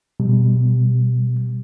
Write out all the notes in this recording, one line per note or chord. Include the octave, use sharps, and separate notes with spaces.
B2 G3